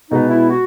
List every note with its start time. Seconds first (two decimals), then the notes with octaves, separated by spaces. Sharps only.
0.11 B2 G#3 B3 D#4
0.30 E4
0.50 F#4